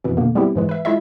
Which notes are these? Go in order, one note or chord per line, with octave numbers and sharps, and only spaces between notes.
F2 B2 E3
B2 D3 A#3
G3 B3 C4 E4 G4
G#2 E3 G#3
B4 E5
G#3 E4 F4 D#5 E5